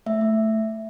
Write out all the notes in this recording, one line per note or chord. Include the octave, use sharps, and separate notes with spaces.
A3 E5
A3